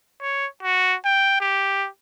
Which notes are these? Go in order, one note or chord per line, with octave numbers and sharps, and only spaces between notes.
C#5
F#4
G5
G4